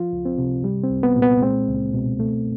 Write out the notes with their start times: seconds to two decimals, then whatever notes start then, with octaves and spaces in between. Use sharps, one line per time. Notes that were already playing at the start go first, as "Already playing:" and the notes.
Already playing: F3 F4
0.13 C#2
0.25 C4
0.38 C3
0.64 G3
0.84 C4
0.90 C2
1.03 B3
1.16 A#2
1.22 B3
1.42 G#3 C4
1.68 C#2
1.94 B2
2.20 A3